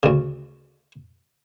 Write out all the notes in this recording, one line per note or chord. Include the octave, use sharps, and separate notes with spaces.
D2 C#3